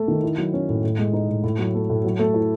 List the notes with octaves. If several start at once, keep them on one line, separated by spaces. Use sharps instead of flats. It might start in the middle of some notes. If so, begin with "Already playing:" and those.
Already playing: A3
D#3
E4
F#3
C#4
A2
A2
G#3
D#4
A2
A2
F#3
A3
A2
F#3
A3
E4